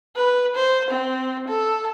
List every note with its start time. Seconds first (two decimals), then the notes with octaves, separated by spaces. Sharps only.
0.16 B4
0.55 C5
0.90 C4
1.48 A4